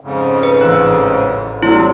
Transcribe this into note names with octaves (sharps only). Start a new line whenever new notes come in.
F2 G#2 C#3
B4
A1 E6 F#6
F#3 G3 A3 C4 E4